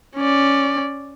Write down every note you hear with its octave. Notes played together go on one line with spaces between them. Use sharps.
C#4 D5